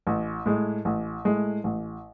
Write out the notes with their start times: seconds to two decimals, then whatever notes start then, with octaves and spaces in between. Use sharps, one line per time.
0.07 A1
0.46 A2 G#3
0.85 A1
1.25 A2 G#3
1.64 A1